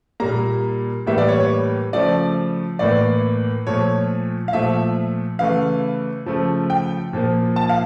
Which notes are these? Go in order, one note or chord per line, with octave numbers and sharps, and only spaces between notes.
A#2 G3 A#3 A#5
A2 E3 G3 A#3 E5
D5
C#5
C#5
C#3 F3 A3 D5
A2 E3 A#3 D5
A#2 F3 A3 C#5
F5
A#2 F3 A3 E5
C#3 E3 A3 F5
C#3 F3 A3
G5
A#2 F3 A#3
A5
F5